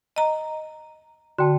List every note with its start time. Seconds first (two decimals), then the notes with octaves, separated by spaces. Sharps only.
0.16 D#5 A#5
1.38 D3 F#4 G5 A5